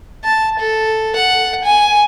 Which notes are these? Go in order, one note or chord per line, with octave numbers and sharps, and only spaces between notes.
A5
A4
F#5
G#5